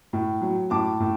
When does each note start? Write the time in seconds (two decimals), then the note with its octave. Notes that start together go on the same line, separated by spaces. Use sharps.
0.13 A2
0.41 F#3
0.70 A2 A5 D6
1.00 A2